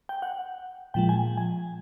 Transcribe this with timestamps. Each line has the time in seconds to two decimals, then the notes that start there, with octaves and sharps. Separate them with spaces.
0.09 G5
0.22 F#5
0.94 A#2 F3 G#3 G5
1.09 G#5
1.37 G#5